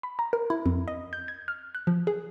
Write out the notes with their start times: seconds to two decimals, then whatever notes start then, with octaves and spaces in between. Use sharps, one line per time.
0.03 B5
0.19 A#5
0.33 A#4
0.50 E4
0.66 F2
0.88 D#5
1.13 G6
1.28 G#6
1.48 F6
1.75 F#6
1.87 F3
2.07 G#4